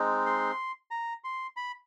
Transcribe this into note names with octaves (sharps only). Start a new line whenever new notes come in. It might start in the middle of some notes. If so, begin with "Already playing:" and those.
Already playing: G#3 C4 D#4
C6
A#5
C6
B5